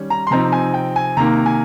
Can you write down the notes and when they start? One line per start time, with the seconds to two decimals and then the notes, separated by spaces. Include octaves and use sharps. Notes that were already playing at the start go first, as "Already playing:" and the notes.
Already playing: D#3 G3 C#4
0.10 A#5
0.27 C6
0.31 C3 F3 C4 D#4 A#5
0.52 G#5
0.74 G5
0.96 G#5
1.17 C3 D#3 A#3 A#5
1.46 G#5